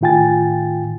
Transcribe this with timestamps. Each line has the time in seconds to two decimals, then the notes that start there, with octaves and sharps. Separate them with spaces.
0.01 A2 D#3 F4 G5 G#5 A6